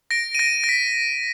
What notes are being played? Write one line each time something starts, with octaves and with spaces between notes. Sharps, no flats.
A#6 D7
D#7
A#6 D7
A#6
B6